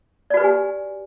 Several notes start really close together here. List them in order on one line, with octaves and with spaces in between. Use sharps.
D5 F#4 B4 G4 G#5